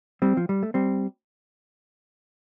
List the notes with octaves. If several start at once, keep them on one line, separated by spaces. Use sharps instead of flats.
G3 C4
F3
G3
A3
G3 C4